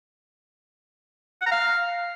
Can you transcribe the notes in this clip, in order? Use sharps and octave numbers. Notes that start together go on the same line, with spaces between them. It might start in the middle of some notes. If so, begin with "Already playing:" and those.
F#5
A#5
F5